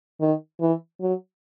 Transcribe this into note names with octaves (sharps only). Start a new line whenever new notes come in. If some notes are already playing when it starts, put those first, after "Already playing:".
D#3
E3
F#3